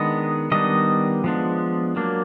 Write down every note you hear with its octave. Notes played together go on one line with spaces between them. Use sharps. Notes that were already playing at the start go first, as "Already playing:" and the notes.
Already playing: D#3 G#3 B3 D4 D#5
D#3 G3 B3 D4 D#5
F3 G#3 B3 D4
F#3 A#3 D4